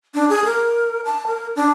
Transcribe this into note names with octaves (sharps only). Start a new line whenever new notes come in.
D4
G#4
A#4
A5
A#4
D4